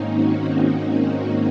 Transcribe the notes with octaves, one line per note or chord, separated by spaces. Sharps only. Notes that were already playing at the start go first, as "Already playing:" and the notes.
Already playing: G#2 D#3 A#3 C4 C#4 D#4
D#4 F#4
D#4 F#4